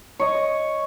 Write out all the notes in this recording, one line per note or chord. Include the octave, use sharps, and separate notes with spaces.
C#5 D#5